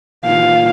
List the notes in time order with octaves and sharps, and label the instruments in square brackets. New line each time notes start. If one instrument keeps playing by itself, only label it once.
[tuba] A#2 [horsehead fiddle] F5